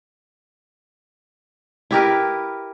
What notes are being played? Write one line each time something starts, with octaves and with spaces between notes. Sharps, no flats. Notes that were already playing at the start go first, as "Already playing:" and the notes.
E4 G4 A#4 B4